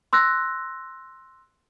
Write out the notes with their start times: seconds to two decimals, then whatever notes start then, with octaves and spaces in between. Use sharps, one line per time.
0.13 C6 E6 F#6 A#6